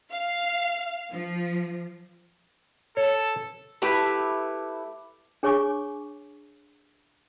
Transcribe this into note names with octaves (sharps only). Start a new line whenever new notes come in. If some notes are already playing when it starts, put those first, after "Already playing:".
F5
F3
A4 C#5
A3 E4 G4 B4
D4 G#4 C#5 G#5 C#6 D6